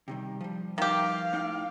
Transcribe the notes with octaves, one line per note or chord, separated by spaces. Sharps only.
C3 D#3 G3
F3 G3
D#3 G4 F5
A2 D#4 G5